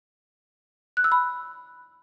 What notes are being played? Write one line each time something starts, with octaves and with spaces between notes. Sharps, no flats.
F#6
E6
B5